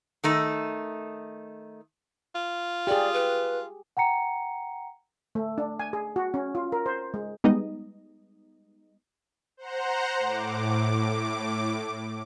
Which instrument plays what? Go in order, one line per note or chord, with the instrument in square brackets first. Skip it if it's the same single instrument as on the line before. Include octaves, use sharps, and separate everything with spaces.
[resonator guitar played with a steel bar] D#3 A3 D#4
[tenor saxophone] F4
[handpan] G4 G#4 [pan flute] D5
[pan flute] B4
[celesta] F#5 G5 A#5 C#7
[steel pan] A3
D4
G#5
G#4
F#4
C#4
F4
A#4
C5
G#3
[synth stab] G3 G#3 B3 D#4 D#5
[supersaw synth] C5 F#5 A#5
A2 D6